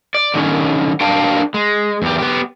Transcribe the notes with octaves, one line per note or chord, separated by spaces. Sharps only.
D5
D3 D#3 C4 C#4
A#3 C4 D4 F5 G5 A5
G#3
E2 G4
B3 G4